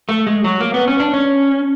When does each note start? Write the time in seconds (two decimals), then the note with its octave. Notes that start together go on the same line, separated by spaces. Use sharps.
0.09 A3
0.27 G#3
0.44 F#3
0.61 A#3
0.74 B3
0.88 C#4
1.00 D4
1.13 C#4